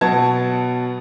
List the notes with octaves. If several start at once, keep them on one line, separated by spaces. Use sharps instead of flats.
B2 F#3 B3 A5 G#6